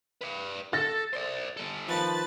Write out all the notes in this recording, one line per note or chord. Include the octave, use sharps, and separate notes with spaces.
B4 D5
A4 A6 A#6
C5 D5
G3 A4
D#3 F3 B4 A5 A6